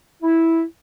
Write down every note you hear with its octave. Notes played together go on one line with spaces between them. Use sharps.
E4